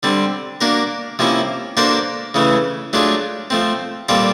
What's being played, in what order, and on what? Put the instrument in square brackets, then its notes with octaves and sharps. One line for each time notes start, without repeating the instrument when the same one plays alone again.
[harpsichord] D3 G3 C4
A#3 D4 F#4 A#4
C3 F3 A#3 C#4 E4
A#3 D4 F#4 A4 C5
C#3 E3 A3 C#4
F#3 A3 D4 F4 G#4
F3 A3 C4
A#2 G3 C4 F4 A4